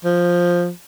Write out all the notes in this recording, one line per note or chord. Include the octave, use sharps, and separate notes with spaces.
F3